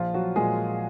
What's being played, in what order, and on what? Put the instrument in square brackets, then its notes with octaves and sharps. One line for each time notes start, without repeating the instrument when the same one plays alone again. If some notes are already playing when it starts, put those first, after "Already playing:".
Already playing: [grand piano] A#1 F3 F4
F#3 F#4
A#2 F3 G#3 A#3 G#4